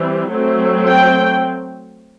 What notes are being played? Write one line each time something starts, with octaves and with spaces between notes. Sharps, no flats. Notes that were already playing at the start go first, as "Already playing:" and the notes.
Already playing: E3 G3 C4
F#3 A3 C4
G5